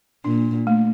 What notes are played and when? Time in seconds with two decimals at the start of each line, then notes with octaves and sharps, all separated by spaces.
0.24 A#2 D4
0.67 A3